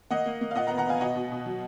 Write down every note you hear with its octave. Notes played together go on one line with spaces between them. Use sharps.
A#3 D#5 F#5
A#3
A#3
F5
A#2 D#5 F#5
F#5 A#5
B3
F#5 A#5
B3 F5 G#5
B2 D#5 F#5
B2
B2
F#3